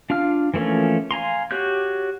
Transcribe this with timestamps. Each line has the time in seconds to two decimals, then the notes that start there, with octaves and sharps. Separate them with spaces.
0.10 D4 F4 F5 F6
0.54 E3 F3 A3 A#3 C#4
1.11 F5 G#5 A#5 C6
1.51 F#4 G4 C#5 F#6 G6